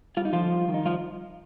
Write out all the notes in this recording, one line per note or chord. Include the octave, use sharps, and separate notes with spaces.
G3 F4
D#4
D3 F3 F4
G3
D#3
D#4
F3 G3 F4